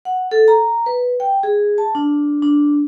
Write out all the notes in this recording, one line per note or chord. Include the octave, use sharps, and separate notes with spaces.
F#5
A4
A#5
B4
G5
G#4
A5
D4
D4